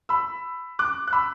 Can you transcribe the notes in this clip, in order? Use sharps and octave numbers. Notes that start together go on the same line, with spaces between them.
B5 E6
D6 F#6
F#6
B5 E6